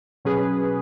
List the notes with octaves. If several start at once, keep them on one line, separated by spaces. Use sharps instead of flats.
B2 F#3 C#4 G#4 B4